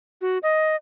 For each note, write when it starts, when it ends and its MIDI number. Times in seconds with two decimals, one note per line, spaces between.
0.21 0.38 66
0.43 0.76 75